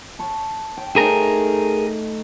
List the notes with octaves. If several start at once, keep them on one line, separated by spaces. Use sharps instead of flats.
A5 C#6
G5
A3 D#4 G#4 A#4